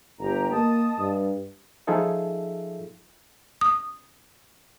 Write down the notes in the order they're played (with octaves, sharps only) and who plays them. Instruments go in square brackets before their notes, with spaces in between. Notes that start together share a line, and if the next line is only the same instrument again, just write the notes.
[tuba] G1 [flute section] G4 A#5
[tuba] A#3 [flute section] D#5 A5 D#6
[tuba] G2
[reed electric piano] F3 D#4 F4 G#4 A4 E5
[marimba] D#6